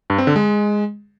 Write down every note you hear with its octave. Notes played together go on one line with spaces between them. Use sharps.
G2
C4
D3
G#3